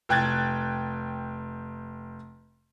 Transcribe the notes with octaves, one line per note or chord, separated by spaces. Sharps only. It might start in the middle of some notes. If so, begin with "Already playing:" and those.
F1 G5 F#6 G#6 A6